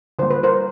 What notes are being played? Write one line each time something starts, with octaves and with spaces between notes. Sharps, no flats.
D3 G3 A#3 C5
B4
A#4 C5